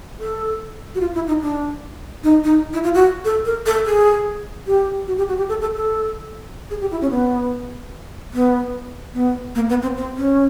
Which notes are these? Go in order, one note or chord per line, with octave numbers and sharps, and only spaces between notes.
A4
F#4
F4
E4
D#4
D4
D#4
D#4
E4
F4
F#4
A4
A#4
A4
G#4
G4
F#4
G4
F#4
G4
A4
A4
A4
G#4
G4
E4
C#4
B3
B3
B3
A#3
B3
C4
C4
C#4